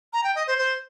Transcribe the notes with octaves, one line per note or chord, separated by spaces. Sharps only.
A#5
G5
D#5
C5
C5